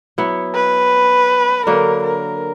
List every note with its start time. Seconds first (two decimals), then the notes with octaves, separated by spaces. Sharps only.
0.18 F#3 B3 E4
0.55 B4
1.67 D3 F#3 A#3 A#4
2.04 A#4